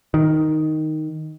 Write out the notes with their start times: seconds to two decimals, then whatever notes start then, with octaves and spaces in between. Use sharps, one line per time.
0.14 D#3